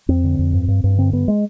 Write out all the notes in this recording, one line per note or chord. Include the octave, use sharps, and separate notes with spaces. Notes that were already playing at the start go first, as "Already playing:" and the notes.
F2 C4
D3
F2
G2
G2
G2
D3 C4
G2 B3
G#3